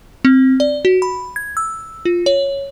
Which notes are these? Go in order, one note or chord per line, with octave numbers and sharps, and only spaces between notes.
C4
D5
F#4
B5
G#6
E6
F4
C#5